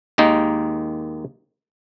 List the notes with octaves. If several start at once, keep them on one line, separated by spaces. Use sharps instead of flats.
D#2 D#3 G#3 A#3 D#4